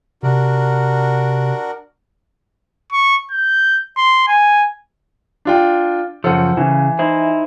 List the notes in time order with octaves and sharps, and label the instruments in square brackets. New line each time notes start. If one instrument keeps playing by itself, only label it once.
[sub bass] C3 [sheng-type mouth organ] D4 F#4 A#4
[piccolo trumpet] C#6
G6
C6
G#5
[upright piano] D4 F4 G5
[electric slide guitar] F#2 C#3 F3 [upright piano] A4 C5 F#5
[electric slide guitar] C#3 [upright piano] E3
[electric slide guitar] D#4 E4 C5